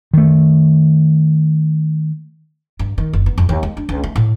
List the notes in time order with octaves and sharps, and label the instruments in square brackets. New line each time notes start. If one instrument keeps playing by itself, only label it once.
[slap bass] D#3 A3
[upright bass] G2
D#3
F#1
B3
F2
D#2
G#3
D4
C#2
A3
A2